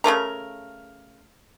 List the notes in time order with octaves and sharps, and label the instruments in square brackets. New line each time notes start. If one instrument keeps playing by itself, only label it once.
[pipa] C#3 G#3 A3 A#4